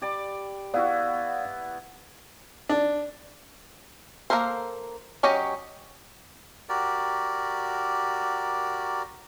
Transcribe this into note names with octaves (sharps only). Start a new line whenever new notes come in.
G4 D5 B5
B3 E4 F#4 D5 F5
D4
A#3 B3 A4 A#4 C5
F#3 C#4 G4 D#5
F#4 G4 A#4 D5